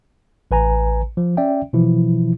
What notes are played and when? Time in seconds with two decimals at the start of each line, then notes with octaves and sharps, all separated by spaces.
0.51 A1 B4 G#5 A#5
1.17 F3
1.37 C#4 D5 E5 G5
1.73 B2 E3 F3 E4